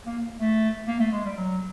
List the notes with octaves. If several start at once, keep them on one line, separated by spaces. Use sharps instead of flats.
A#3
A3
A#3
A3
G#3
G3
F#3